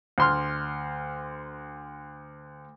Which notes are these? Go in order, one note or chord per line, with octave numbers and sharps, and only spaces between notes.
D2 C6 F6